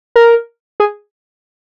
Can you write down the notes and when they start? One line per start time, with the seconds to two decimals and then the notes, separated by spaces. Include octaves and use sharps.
0.16 A#4
0.80 G#4